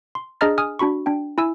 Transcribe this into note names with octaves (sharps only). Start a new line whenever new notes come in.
C6
D4 G#4 D#5 A#5 F6 A6
G#5 D#6 F6
D4 F#4 B5 C#6
D4 G5
E4 G#5 E6